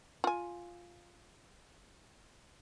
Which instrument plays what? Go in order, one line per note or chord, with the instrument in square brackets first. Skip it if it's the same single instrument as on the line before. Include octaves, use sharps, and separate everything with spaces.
[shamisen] F4 G#5